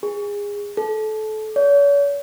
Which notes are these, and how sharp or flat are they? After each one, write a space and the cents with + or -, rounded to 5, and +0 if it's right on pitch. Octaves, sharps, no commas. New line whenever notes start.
G#4 -25
A4 -25
C#5 +45